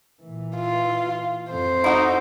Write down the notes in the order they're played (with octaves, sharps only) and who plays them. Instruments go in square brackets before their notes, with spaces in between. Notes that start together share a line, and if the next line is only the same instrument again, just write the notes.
[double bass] A#2 E3
[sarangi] F4
[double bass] F2 [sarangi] C5
[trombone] D#4 [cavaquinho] E4 F#4